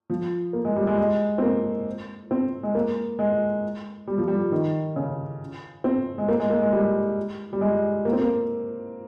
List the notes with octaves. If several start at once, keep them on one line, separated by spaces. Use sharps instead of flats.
F3
A#3
G#3
G3
G#3
G#3
C4
A#3
C4
G#3
A#3
G#3
G3
F3
G3
D#3
C#3
C4
G#3
A#3
G#3
A#3
G#3
G3
G3
G#3
A#3
C4
A#3